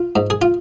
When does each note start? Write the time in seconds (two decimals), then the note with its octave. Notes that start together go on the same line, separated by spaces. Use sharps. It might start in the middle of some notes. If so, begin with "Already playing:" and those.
Already playing: F4
0.16 G#2
0.30 G#4
0.42 F4